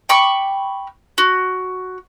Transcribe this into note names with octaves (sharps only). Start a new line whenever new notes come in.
G5 B5 C#6 D6
F#4